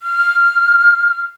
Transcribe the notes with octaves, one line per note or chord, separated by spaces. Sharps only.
F6